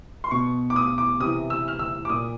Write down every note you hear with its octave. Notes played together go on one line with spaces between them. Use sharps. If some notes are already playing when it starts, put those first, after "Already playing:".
C6
B2 C#6
D6
D#6
D6
C3 D#6
E3
E6
F6
E6
D6
A#2 D#6